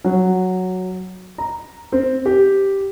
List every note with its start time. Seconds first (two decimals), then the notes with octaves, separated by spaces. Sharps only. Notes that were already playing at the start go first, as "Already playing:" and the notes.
0.04 F#3
1.38 A#5
1.92 C4
2.26 G4